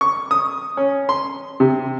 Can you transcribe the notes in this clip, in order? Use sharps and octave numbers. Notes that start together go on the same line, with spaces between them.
C#6
D#6
C#4
C6
C3